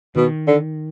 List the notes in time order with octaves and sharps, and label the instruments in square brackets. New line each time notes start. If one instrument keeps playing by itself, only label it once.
[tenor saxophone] B2 [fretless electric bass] D#3
[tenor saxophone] D3